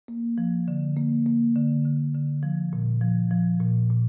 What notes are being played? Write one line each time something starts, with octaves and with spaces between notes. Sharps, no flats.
A#3
F3
D3
A#3
A#3
D3
D3
D3
F3
A#2
F3
F3
A#2
A#2